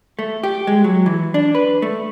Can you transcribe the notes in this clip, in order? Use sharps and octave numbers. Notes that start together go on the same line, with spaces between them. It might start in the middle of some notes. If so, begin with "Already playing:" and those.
A3
G4
G#3
F#3
E3
D4
B4
A3